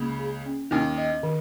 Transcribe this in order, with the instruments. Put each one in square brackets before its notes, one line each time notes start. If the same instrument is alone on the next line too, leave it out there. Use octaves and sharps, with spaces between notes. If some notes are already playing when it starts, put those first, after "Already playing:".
Already playing: [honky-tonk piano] C#2 C#3 [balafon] A#3
[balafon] G#4
C#4
[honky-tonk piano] D#2 D#3 [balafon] C#4
[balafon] D#5
D#3